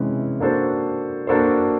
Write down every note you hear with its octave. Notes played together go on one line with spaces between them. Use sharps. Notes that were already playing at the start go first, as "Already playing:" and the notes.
Already playing: C3 E3 G#3 C#4 E4
A#3 D4 F#4 A4 C5
A#3 D4 F#4 A4 C5